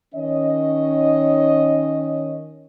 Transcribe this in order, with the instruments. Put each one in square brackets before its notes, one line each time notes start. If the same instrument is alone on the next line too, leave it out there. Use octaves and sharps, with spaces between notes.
[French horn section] D#3 C#4 C#5 D#5